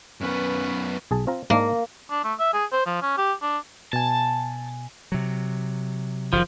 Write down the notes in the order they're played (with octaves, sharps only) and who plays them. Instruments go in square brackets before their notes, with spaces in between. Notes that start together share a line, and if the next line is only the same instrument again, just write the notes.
[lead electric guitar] F#2 B3 [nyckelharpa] C#4 B4
[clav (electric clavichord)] B1 G#4 A5
C4 F4 A#5
[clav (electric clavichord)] G#2 G#3 D4 [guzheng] A#3
[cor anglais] D4
A3
E5
G#4
C5
F3
C#4
G4
D4
[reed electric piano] B2 G#5 [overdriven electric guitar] A5
[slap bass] C3 F#3
[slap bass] F#1 D#3 [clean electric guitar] F3